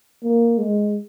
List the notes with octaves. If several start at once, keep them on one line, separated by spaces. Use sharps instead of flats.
A#3
G#3